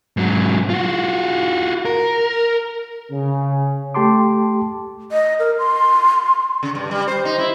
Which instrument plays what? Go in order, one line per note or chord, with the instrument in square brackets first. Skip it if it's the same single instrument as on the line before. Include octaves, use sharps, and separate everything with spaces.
[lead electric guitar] G#2 F#3
F4 F#4
A#4
[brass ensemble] C#3
[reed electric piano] A3 G4 A5 C6 D6
[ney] D#5
A#4
C6
[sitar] C#3
G2
G3
C5
D#4
E4